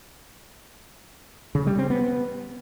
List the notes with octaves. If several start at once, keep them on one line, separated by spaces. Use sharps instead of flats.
C#3
G3
C4
B3